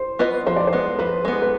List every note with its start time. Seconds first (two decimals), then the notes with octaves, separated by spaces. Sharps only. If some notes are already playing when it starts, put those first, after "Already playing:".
Already playing: C5
0.19 B3 F4 B4 D#5
0.47 F3 C5
0.56 D5
0.67 C5
0.73 G#3 B3
0.99 F3 B4
1.25 G#3 B3
1.42 B4